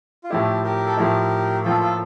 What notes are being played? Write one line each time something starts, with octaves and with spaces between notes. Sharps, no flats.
F4
A2 F3 A3 E4 G4
G4 A#4
A4
A2 F3 A3 E4 G4 A#4
A2 F3 A#3 F4 A4
F4 A4